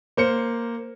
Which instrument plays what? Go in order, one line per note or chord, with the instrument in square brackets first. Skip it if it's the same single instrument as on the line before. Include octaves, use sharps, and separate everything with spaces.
[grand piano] A#3 C5 C#7